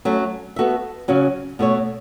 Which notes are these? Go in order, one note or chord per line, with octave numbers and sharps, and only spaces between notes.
F#3 A3 C#4
B3 F#4 A4 E5
C#3 F#3 C#4 F#4
B2 A3 F#4 C#5